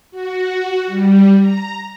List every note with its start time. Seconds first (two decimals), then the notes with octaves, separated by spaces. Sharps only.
0.11 F#4
0.87 G3
1.39 A#5